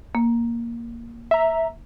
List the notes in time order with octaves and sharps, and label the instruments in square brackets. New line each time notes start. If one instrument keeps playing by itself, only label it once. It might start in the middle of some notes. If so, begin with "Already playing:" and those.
[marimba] A#3
[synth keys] E5 A#5